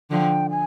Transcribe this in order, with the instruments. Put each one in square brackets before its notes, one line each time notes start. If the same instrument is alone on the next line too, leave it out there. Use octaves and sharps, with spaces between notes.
[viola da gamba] D3 F3 [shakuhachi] G5
[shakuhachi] G#5